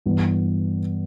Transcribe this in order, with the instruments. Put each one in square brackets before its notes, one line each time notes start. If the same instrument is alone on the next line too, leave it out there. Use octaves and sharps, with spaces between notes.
[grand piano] G2 E3 B3